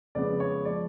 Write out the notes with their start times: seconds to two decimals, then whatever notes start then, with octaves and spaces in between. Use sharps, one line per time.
0.15 F2 C#3 G#3 B3 D5
0.40 C#5
0.65 F3 G#3 D5